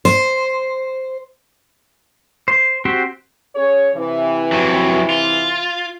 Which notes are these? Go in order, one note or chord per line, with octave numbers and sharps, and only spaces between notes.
C5
C5
C4 F#4 G4 C5 G5
C#4 G#4 C#5
C3 E3
F2 F#3
F4